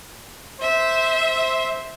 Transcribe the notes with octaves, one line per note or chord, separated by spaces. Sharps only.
C5 E5